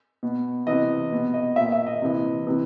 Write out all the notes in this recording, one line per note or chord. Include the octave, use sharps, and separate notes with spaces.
B2
C3 E3 D#5
B2
D#5
A#2 E5
E5
D#5
C3 E3
C3 E3